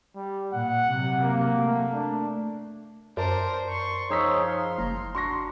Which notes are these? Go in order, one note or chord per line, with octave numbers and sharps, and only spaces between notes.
G3
A#2 F#5
C3 F#3
A#3
A3
D4
F#2 A#4 C5 D5 A5
C6 C#6
F3 D#4 G#4 C#5 C6 E6 B6
F5
F#1 A#5
D4 F#4 C6 C#6 A#6